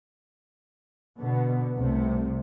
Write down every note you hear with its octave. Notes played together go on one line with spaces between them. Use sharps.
B2 D3 B3
C2 C3 A3